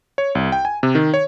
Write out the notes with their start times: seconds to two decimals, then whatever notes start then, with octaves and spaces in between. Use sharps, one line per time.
0.18 C#5
0.35 C2
0.52 G5
0.65 G#5
0.83 C3
0.95 D#3
1.14 C#5